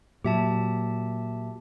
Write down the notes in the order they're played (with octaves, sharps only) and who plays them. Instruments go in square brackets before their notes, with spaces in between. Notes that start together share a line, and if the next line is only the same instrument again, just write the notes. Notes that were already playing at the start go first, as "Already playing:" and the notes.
[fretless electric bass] A#2 F#3 [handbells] G4 E5 A5